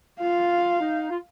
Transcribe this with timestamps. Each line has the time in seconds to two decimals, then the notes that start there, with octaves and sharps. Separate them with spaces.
0.20 F4 F5
0.80 D#4
1.10 F4